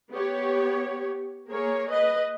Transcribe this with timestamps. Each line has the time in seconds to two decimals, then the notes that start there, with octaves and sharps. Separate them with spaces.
0.11 B3 G4 C#5
1.50 A#3 G#4 A#4 C#5
1.90 B4 D#5